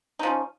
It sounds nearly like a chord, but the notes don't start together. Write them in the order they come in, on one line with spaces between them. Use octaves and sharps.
D#4 F3 C#4